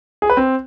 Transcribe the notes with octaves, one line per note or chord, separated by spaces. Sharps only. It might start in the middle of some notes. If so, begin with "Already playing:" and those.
G#4
B4
C4